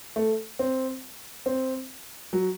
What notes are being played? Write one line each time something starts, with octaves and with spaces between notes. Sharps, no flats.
A3
C4
C4
F#3